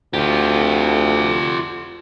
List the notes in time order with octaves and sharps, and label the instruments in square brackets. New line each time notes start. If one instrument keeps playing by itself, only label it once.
[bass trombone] D2 [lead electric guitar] F4 G4